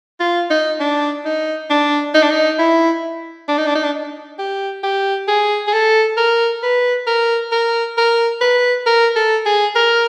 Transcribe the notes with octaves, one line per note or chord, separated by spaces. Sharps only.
F4
D#4
D4
D#4
D4
D#4
D4
D#4
E4
D4
D#4
D4
D#4
D4
G4
G4
G#4
G#4
A4
A#4
B4
A#4
A#4
A#4
B4
A#4
A4
G#4
A#4